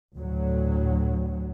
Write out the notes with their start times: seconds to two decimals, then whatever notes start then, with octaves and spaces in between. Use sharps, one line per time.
0.15 D2 A2 F#3